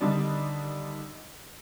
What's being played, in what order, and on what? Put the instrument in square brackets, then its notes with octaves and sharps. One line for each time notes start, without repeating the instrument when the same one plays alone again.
[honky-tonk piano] D3 D#3 G3 D4 D#4